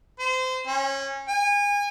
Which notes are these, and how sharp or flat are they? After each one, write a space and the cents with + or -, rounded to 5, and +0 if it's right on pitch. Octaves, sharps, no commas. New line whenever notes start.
C5 -25
C#4 -25
G#5 -30